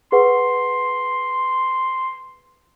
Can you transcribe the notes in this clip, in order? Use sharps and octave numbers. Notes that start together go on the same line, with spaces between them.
G#4 B4 F#5 C6